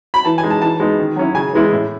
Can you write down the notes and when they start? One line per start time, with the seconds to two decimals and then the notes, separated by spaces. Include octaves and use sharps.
0.14 B5
0.25 E3 A5
0.38 G#5
0.43 G#3 D#4
0.50 A5
0.62 E3 A5
0.80 G#3 B3 D#4
0.99 D#3
1.16 F#3 C#4 E4
1.35 C#3 G#5
1.53 E3 G#3 B3 E4
1.71 A2